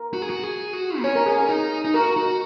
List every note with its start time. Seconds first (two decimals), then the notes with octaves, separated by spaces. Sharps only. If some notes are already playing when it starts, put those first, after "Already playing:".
Already playing: A#4
0.13 F#4
0.22 G#4
0.30 F#4
0.43 G#4
0.73 F#4
0.99 A#3
1.04 C#4 C#5
1.15 A#4
1.26 G#4
1.37 A#4
1.49 D#4
1.85 D#4
1.94 F#4 A#4
2.16 F#4